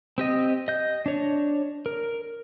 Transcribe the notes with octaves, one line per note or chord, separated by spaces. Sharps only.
C4 G4 D#5
D#5 G6
D4 C#5
A#4